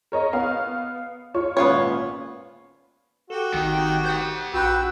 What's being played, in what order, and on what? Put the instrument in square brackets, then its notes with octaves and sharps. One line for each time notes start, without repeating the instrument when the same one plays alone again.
[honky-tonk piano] A#4 C#5 D#5
B3 F5
F4 C#5 C#6
[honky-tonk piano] G#1 A#2 C#4 [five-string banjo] B3 F4 C#5
[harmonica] F#4 G4 [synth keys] A4
[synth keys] G#1 [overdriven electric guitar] D#3
[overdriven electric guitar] C5 F#5 [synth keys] D#6 F#6 G6
[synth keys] A#1 [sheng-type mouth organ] F#4 E6 [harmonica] B4 G5